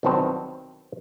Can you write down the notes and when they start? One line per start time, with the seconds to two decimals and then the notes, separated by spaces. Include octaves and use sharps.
0.03 C2 B2 D#3 F#3 C4 A5